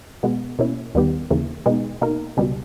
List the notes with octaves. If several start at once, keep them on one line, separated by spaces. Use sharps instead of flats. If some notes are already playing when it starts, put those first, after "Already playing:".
B2 G#3 B3
B2 A#3 C#4 E4
D#2 D#3 G3 B3 G4
D#2 C#3 E3 A#3
B2 G#3 B3 D#4
B2 A#3 D#4 A#4
C#2 B2 G3